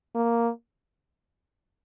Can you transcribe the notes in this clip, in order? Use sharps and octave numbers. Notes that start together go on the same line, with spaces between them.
A#3